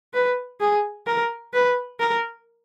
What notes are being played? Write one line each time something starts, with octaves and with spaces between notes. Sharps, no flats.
B4
G#4
A#4
B4
A#4